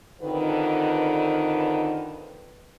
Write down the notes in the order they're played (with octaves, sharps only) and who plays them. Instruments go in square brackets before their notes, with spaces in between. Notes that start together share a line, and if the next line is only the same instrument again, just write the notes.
[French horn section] F2 D3 D#3 B4